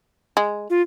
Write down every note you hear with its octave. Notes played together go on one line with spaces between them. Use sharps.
G#3
F4